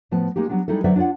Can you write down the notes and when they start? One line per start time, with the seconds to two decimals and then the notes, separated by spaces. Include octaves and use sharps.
0.11 A2 F3 B3 A5
0.36 G#3 A#3 D#4 G4
0.49 F#3 G3 B3 D4
0.68 G3 G#3 D#4 E4 A4
0.84 D3 F#3 B4 C5 D5 E5
0.96 D4 F4 C#5 D5 F#5